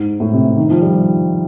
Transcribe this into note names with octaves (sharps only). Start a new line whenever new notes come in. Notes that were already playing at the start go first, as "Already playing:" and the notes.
Already playing: G#2
A2
C3
D#3
F3
G3